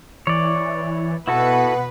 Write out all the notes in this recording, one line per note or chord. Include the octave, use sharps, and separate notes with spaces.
E3 C#5 D5
B2 B3 E4 F#4 A4 B4 F#5